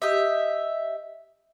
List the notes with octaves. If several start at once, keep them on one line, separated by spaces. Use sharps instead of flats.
G4 D#5 E5